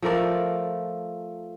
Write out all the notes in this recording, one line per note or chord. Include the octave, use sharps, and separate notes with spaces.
F3 A3 A#4 D5